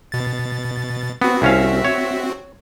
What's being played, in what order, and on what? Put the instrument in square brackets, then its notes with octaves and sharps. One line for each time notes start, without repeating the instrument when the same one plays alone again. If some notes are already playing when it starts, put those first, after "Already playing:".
[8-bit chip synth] B2 A6
[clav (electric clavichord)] B3 [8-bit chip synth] C4 F#4
[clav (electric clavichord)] C2 C#4 F5 [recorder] E5
[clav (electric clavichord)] C#5